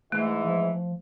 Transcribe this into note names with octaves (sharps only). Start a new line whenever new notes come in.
G#2 E3 A3
F3